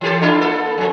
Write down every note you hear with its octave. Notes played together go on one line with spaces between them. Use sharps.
E3 G4 A4
D4 E4 F4
A#3 A4
F2 F3